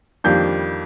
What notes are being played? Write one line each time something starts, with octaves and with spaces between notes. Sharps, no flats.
F2 D#3 G3 A#3 D4 G6